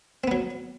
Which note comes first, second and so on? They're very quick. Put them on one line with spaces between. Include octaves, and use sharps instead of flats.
C4 B3 F#3